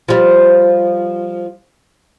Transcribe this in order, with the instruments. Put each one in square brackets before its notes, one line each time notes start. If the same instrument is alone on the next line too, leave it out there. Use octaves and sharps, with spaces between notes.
[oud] F3 G3